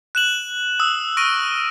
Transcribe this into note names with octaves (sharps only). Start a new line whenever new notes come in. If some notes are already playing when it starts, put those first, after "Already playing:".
F#6 E7 F#7
D#6 E6
C#6 F6 A#6 D7 D#7